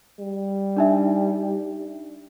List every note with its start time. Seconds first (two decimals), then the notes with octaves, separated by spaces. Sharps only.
0.19 G3
0.77 D4 D#4 E5